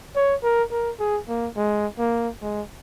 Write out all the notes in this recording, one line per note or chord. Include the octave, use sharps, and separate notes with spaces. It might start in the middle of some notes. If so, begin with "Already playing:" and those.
C#5
A#4
A#4
G#4
A#3
G#3
A#3
G#3